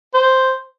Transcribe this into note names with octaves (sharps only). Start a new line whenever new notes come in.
C5